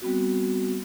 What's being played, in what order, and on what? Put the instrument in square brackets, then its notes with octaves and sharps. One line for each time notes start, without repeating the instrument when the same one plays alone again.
[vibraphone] G3 B3 C4 F#4